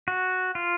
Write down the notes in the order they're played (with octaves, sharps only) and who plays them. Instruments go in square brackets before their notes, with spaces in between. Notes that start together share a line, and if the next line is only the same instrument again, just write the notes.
[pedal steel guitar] F#4
F4